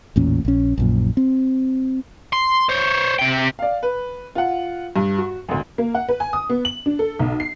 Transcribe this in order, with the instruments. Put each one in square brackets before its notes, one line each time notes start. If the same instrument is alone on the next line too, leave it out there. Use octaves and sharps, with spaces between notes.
[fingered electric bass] A1 E2 A#2 C#4
A#1 C#4
A#1 F#2 A#2
C4
[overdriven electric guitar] C6
C5 C#5
C3 G5
[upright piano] D5 F5
B4
F4 F#5
G2
F#4
G#1 D2
[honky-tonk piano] A#3
F#5
B4
G#5
D#6
B3
F#7
D4
A4
B1
C7